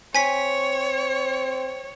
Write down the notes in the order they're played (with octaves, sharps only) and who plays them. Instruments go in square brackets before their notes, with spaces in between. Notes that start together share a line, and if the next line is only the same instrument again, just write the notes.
[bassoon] C4 [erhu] C#5 [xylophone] G#5 B6